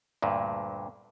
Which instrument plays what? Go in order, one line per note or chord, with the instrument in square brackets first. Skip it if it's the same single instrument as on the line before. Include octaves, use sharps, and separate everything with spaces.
[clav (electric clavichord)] D2 G2 A#2